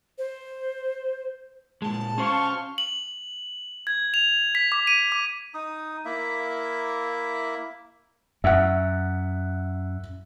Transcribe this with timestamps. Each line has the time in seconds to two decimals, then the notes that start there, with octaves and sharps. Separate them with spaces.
0.18 C5
1.82 A#2 G#3 A5
2.18 C#4 F#4 C5 F5 C6 C#6
2.78 F#7
3.87 G#6
4.14 F7
4.55 B6
4.72 D6
4.87 D#7
5.12 D6
5.54 D#4 D#6
6.05 A#3 E4 E5
8.44 F#2 E5 F#5